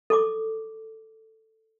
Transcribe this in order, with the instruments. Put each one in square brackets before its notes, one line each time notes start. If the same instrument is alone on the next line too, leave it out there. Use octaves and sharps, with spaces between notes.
[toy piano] A4 C#6 D6